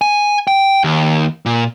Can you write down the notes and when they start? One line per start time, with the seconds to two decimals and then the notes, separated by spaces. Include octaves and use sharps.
0.01 G#5
0.47 G5
0.84 D#2
1.46 A#2